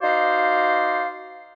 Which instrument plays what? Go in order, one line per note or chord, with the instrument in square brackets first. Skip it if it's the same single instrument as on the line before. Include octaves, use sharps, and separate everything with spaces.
[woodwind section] D#4 F#4 C5 D5 F5